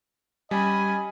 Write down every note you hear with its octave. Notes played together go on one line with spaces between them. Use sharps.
G3 C#4 D#5 G#5 B5